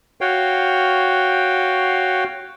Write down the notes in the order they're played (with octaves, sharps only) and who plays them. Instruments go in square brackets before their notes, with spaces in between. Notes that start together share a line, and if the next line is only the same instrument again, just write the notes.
[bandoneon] F#4 C#5 F5 G5